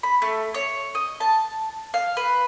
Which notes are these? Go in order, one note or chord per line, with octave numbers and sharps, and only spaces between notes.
B5
A3
C#5
D#5
A5
F5
B4